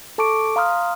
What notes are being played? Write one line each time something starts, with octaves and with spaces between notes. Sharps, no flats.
A4 A5 C#6 D6 D7
F5 A#5 C6 D#6 F6